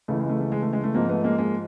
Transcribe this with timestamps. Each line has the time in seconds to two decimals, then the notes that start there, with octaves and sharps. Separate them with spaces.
0.08 C#2 C#3 E3 A3
0.19 G#3
0.29 A3
0.41 A3
0.52 G#3
0.63 A3
0.73 G#3
0.84 A3
0.94 G#2 F3 A#3 C4
1.09 A3 B3
1.24 G#3 A#3
1.38 G#3 A#3